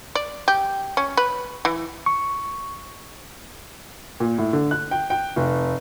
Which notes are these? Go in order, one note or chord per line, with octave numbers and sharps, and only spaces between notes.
D5
G4
C#4
B4
E3
C#6
A#2
A2
D3
F#6
G5
G5
F1